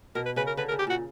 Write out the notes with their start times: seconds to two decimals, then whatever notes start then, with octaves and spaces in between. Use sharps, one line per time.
0.15 B2 A#4
0.26 B4
0.36 C#3 B4
0.47 A#4
0.57 D3 B4
0.69 A#4
0.72 C#3
0.79 G4
0.87 A#2 F#4